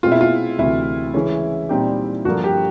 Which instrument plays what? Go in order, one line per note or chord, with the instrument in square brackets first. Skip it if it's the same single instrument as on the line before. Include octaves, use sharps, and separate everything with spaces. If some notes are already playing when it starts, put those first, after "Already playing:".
[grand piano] B2 G#3 C4 [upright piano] F4
[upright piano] E4
F4
[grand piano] D2 C3 E3 [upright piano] E4
[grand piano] C#3 E3 G#3 C#4
A#2 G3 C4 D#4 G4
[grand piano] G2 D3 F3 A#3 [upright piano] F#4
[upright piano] G4